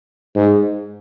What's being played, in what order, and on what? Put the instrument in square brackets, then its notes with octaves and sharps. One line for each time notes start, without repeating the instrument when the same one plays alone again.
[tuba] G#2